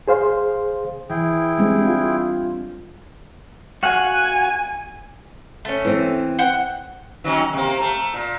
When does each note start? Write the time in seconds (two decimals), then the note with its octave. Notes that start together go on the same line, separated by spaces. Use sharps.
0.08 G#4 C5 F5 C6
1.10 E3 E4 G#4 G5
1.58 G3 G#3 C4 D4
1.86 F4
3.83 F#4 F5 F#5 G#5
5.65 A3 C#4
5.85 E3 C4
6.39 F#5 G5
7.24 D#3 F#3 C#4
7.53 C3 A#3
7.80 A3
8.13 A#2